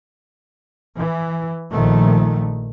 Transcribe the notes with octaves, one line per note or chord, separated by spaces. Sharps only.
E3
A#1 D#3 F3 A3